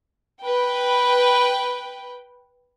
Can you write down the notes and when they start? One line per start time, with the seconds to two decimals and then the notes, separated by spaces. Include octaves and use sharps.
0.41 B4 G5